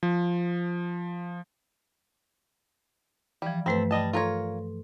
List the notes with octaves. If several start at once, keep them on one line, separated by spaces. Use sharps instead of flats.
F3
E3 F3 G3
G2 A3 C4 A4 B4
G3 D#5 A5
F4 A4 A#4 C#5 C6